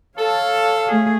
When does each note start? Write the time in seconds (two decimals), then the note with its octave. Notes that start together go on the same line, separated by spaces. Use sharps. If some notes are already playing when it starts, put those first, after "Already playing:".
0.19 A4 C#5 F5
0.88 A3 G#4